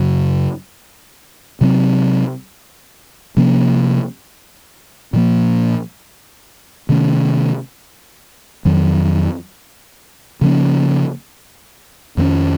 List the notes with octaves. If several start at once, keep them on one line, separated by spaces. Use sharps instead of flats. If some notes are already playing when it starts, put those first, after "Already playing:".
Already playing: F#2 C#3 F#3
C3 F#3 C4
C3 F3 A#3 C#4
A#2 F3 A#3
C3 D#3 A3 C#4
F2 D#3 F#3
C#3 F3 A#3 C#4
F2 D#3 A#3 C#4